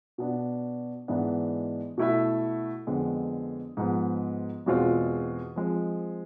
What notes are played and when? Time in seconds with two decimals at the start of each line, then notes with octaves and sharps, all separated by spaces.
0.18 B2 B3 D4
1.08 G#2 E3 G#3 B3 D4
1.98 B2 A3 E4 A4 E5
2.87 F2 D3 G#3 B3
3.77 G#2 F3 G#3 B3
4.66 E2 B2 G#3 C4 F4
5.56 F3 G#3 C4